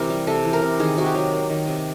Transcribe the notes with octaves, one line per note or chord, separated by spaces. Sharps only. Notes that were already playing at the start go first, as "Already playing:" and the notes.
Already playing: C3 E3 A#4
G3
C3 A4
E3
A#4
C3
D#3 G#4
C3 F#4
G4
F#3
A#3
D#3
C3